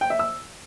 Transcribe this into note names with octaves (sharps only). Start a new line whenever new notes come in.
G5
E5
E6